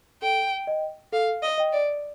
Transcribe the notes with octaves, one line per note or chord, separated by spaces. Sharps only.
A4 G5
D#5 G5
A4 F5
D#5
D#5 G5
D5